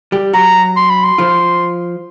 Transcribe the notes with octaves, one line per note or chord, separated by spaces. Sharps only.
G3 G4
F#3 F#4 A#5
C6
B5
C6
F3 F4